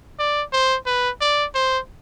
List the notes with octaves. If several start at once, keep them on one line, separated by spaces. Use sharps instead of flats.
D5
C5
B4
D5
C5